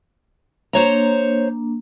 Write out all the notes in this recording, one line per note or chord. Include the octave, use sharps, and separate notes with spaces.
A#3 D4 C5 C#5 A#5